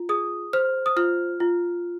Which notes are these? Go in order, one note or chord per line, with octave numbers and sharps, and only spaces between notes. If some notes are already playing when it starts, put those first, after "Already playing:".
Already playing: F4
G#4 D#6
C5 F6
D#6
F4 F6
F4